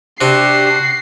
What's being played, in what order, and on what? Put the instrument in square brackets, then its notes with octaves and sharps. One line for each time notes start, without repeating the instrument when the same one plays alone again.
[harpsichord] C3 C4 [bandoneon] D4 G4 [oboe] F#4 [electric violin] C7